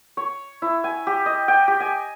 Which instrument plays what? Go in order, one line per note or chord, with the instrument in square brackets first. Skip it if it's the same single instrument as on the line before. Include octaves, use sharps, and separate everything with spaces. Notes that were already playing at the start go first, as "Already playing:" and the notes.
[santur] C#5
E4
G#5
G4
D#5
G5
G4
G#5